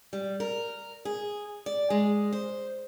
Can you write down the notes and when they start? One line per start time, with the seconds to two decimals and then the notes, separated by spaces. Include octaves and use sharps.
0.13 G3
0.40 A#4
1.05 G#4
1.66 D5
1.90 G#3
2.32 C5